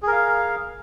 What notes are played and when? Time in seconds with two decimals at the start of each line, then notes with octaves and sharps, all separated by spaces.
0.03 G#4
0.08 A#4
0.12 F5